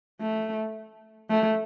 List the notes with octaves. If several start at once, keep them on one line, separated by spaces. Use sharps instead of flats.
A3
A3